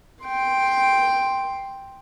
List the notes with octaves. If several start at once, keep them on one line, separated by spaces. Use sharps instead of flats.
G5 C6